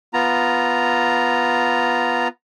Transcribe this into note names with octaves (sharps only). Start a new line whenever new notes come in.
B3 F4 A#5